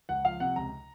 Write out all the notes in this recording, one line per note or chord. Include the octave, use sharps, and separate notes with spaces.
C#2 F#5
F3 F5
C3 F#5
C#2 A#5